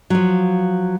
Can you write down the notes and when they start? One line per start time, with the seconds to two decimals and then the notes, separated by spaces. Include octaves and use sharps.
0.10 F3 F#3